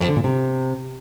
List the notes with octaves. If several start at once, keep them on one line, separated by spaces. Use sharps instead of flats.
F2
D3
A#2
C3